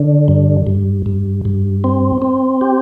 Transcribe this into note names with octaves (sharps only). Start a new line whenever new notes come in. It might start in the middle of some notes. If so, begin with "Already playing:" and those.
Already playing: D3
G2
G2
G2
G2
C4
C4
G4